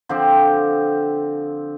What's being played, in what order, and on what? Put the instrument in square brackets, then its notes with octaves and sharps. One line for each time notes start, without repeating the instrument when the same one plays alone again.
[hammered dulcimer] D3 F3 C4 G4